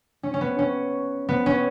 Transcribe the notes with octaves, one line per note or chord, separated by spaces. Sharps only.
C#4
C#4
B3
C#4
B3
C#4